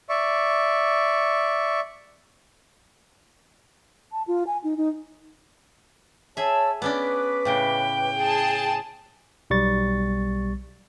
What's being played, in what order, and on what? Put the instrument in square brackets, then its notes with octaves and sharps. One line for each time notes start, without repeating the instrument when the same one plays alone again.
[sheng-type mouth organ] D5 E5 C#6
[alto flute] A5
F4
G#5
D#4
D#4
[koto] G#4 E5 [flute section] C#5 A5 E6
[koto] B3 C#4 D4 [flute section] B4 D6
[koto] A2 C#3 [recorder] G5
[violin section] G#4 A5
[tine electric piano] B1 G3 C#6 A6